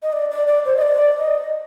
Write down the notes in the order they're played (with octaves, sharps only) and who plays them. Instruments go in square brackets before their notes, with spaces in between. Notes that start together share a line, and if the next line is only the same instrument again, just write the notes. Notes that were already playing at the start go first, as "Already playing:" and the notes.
[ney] D#5
D5
D5
D5
C5
D#5
D5
D#5